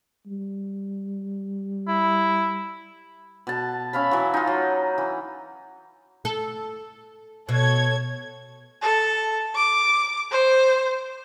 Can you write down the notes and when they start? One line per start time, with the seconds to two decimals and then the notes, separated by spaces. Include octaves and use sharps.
0.26 G3
1.88 E4
3.47 B2 A5
3.93 C#4 E5 F5 B5
4.11 E3 F#3
4.34 D#4 F4
4.47 F#3
4.98 E3
6.25 A4
7.49 B2 A4 C#5 G#6
8.82 A4
9.55 D6
10.31 C5